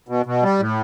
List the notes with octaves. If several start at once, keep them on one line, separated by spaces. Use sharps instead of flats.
B2
B2
G3
A2